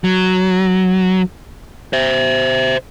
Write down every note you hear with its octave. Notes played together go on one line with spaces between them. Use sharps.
F#3
C5 E5